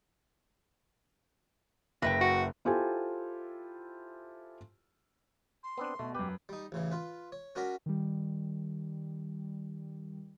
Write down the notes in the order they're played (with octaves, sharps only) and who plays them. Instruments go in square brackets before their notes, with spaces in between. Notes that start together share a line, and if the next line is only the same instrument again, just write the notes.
[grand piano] F#1 [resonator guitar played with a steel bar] B4 E5 G5 [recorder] A#6
[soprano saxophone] F#4
[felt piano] E4 F4 G4 A4 C5 G#5
[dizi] C6
[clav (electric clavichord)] B3 C4 D4
[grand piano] B2 [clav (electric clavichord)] A3
[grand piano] F#2 B4 [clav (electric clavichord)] G4
[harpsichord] G3 D#4
A1 C#3 E3
F4 B4
C#5
C#4 F#4 A#4 C#5 D5 B5
[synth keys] D#3 G3